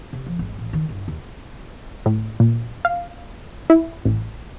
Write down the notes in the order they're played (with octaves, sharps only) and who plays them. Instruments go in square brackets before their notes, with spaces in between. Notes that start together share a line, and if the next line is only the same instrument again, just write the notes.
[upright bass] C3
F3
G#1
A1
D#3
G1
D#2
[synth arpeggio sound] A2
A#2
F5
E4
A1